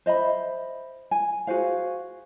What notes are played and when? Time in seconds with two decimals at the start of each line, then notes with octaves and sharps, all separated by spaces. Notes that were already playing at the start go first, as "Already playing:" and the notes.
0.06 C5 D#5 E5 B5
1.11 G#5
1.47 F#4 G#4 C5 F5